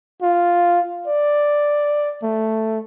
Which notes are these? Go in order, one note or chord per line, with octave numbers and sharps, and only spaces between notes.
F4
D5
A3